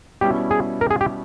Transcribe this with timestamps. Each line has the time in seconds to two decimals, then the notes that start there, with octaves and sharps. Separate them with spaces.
0.21 B2 G3 C#4 E4 G4
0.51 G#4
0.81 A#4
0.91 G#4
1.01 G4